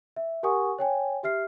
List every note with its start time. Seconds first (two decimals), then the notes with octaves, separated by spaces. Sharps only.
0.16 E5
0.43 G4 A#4 F#5 G#5 C#6 D#6
0.79 C#5 G5 G#5
1.23 G4 E5 F6 C7